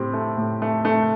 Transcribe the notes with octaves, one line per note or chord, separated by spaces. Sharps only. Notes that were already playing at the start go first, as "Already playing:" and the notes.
Already playing: A2 C4 G4
A3
A2
A3
A3